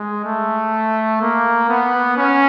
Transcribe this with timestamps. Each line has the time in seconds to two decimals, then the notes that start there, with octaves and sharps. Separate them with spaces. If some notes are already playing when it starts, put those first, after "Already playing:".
Already playing: G#3
0.24 A3
1.21 A#3
1.69 B3
2.17 C#4